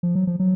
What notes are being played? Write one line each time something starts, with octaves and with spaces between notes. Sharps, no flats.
F3
F#3
F3
F#3